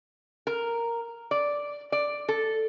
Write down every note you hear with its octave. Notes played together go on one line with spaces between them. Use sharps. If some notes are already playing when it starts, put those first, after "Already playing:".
A#4
D5
D5
A4